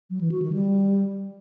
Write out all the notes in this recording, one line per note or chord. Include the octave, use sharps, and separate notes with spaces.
F#3
E3
F#4
D#3
G3